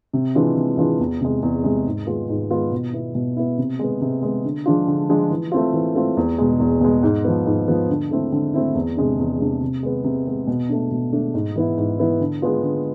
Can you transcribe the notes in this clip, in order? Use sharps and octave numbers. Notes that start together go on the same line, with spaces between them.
C3
E3 G#3 D4 F4
C3
E3 G#3 D4 F4
E2
C3 G#3
E2
C3 G#3
G#2
G#3 B3 F4
G#2
G#3 B3 F4
B2
B3 E4
B2
B3 E4
C3
G#3 B3
C3
G#3 B3
D3
F3 G#3 D4 F4
D3
F3 G#3 D4 F4
E3
A3 C4 F4
E3
A3 C4 F4
E2
B2 G#3
E2
B2 G#3
G#2
F3 B3
G#2
F3 B3
D3
A3 C4 E4
D3
A3 C4 E4
E2
C3 G#3 D4
E2
C3 G#3 D4
C3
G#3 B3
C3
G#3 B3
B2
A3 D4
B2
A3 D4
G#2
E3 B3 E4
G#2
E3 B3 E4
D3
G#3 B3 F4
D3